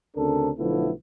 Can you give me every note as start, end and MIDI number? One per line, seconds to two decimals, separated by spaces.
0.16 0.51 38
0.16 0.51 49
0.16 0.51 60
0.16 0.51 62
0.16 0.51 69
0.16 0.51 70
0.58 0.91 35
0.58 0.91 50
0.58 0.91 53
0.58 0.91 57
0.58 0.91 59
0.58 0.91 64